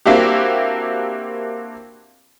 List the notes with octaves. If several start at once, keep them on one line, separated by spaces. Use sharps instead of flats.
A#3 C4 D4 E4 F#4 G4